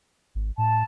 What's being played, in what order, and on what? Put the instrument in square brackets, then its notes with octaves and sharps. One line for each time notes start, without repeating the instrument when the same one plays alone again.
[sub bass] G#1
[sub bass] A2 [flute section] A5